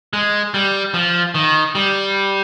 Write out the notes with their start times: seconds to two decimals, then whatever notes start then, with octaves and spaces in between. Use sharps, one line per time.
0.13 G#3
0.54 G3
0.94 F3
1.35 D#3
1.75 G3